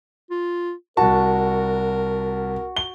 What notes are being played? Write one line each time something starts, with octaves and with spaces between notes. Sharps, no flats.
F4
C2 F#4 A#4 A5
G7